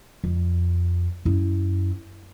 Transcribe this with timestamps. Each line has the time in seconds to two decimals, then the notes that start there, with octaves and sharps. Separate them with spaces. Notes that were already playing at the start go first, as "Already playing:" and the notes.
0.24 F2
1.25 F#2 E4